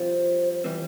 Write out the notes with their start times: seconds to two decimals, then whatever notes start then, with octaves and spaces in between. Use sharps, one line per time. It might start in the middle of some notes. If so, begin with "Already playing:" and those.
Already playing: C2 C3 F3 C4 F4 C5
0.53 C5
0.64 E3 G3 C4 B4